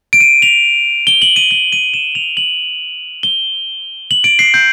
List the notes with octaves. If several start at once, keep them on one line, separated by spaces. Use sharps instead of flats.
D7
D#7
F7
G7
F#7
D#7
D#7
D#7
E7
F7
F#7
G7
F#7
D7
C7
G6